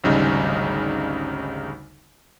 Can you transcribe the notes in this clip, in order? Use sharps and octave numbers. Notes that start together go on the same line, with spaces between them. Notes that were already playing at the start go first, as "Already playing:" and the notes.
G#1 D2 C#3 G3 D#4